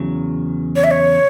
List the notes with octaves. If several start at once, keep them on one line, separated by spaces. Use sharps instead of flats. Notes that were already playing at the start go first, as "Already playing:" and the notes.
Already playing: E2 C#3 F#3
C#5
E5
C#5